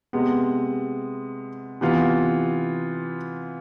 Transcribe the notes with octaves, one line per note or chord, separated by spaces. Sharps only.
C3 G#3 B3
C3 E3 B3 F4